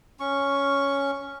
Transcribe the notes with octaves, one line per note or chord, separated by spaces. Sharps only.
C#4 C#6